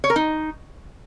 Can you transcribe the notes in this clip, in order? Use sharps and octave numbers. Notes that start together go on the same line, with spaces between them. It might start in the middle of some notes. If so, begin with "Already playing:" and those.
C#5
A#4
D#4